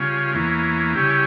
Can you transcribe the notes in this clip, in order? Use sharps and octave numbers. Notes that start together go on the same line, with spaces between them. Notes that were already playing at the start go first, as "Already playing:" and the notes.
Already playing: C#3 G3 C#4 F4
E2 E3 A#3 C#4
C#3 G3 C#4 E4 G4